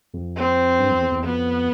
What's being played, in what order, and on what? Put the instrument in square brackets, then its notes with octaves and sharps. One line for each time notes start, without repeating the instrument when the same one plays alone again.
[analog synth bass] F2
[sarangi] C4
[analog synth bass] G2
F2
E2
E2
[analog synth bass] F2 [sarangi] B3